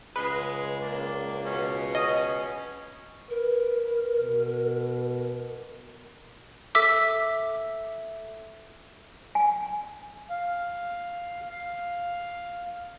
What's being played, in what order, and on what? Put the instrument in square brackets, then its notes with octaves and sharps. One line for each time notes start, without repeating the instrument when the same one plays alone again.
[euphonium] C#2 [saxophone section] G#3 [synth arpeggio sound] B4
[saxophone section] A#3 D4
[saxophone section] B2 [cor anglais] C#4
[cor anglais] C#4 [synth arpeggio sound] D#5
[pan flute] A#4 [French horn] B4
[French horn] B2
[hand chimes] A4 E5 [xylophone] D6 E6 B6
[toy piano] G#5
[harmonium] F5
F5